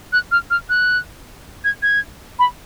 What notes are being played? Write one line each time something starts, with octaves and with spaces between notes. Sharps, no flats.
F#6
F6
F6
F#6
G#6
G#6
B5